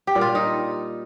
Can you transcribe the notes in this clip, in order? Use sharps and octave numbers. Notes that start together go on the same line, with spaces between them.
G4
A#2 G3
F4
D#4